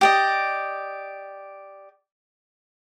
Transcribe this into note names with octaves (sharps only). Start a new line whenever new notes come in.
G4 D5 D#5